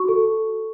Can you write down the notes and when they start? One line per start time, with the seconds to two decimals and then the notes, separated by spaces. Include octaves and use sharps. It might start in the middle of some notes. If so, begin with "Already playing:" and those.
Already playing: F#4 C#6
0.08 A4